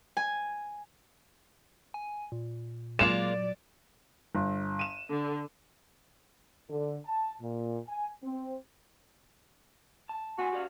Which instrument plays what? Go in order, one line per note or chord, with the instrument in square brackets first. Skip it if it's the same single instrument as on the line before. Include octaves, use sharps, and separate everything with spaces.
[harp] G#5
[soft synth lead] G#5
A#2
[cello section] F#3 D5 [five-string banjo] G#3 A#3 F4 [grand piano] E7
[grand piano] G1
D#7 E7
[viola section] D3
[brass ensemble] D3
A5
A#2
G#5
C4
[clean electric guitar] A5
[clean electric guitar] A#2 G#5 C6 [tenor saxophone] F#4
[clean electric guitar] G4 D5 F5